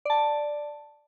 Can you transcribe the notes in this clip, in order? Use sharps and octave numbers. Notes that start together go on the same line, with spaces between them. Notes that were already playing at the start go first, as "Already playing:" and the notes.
D5 A5